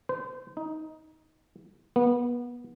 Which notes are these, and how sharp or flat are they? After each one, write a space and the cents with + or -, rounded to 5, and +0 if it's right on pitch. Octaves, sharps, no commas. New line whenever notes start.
C5 -30
D#4 +15
B3 -25